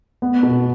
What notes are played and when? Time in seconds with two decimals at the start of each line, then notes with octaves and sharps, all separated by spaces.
0.22 B3
0.43 B2